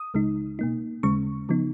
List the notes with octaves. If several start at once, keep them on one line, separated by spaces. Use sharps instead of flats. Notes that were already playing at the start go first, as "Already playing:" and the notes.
Already playing: D#6
C#2 C#3 G#3 D#4
B2 A#3 D#4
D#2 C#3 G#3 C#4 C#6
C#3 F3 B3 D#4